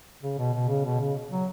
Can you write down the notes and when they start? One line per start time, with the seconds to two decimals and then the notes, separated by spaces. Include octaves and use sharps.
0.22 C#3
0.38 B2
0.54 B2
0.68 C#3
0.85 B2
1.00 C#3
1.31 F#3